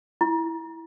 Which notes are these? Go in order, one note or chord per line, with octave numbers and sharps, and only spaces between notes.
E4